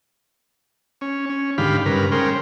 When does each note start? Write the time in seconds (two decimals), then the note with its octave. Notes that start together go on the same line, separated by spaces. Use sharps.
1.01 C#4
1.30 C#4
1.58 G#2 D3 D#3 G4 F5 B5
1.86 G2 C#3 A#4 B4
2.12 G#3 C#4 A#4 C5 G5